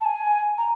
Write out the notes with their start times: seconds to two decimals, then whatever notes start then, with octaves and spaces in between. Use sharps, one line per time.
0.01 A5
0.05 G#5
0.58 A#5